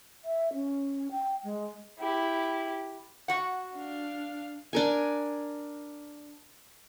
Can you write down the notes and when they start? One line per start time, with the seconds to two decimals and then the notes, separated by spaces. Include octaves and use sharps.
0.25 E5
0.53 C#4
1.11 G5
1.44 G#3
1.99 E4 G4
3.28 F#4 F#5
3.75 D4 F5
4.73 D4 A#4 G#5